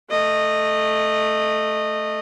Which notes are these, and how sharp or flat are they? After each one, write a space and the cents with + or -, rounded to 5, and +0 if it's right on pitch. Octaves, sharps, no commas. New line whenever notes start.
A3 +0 D#5 -15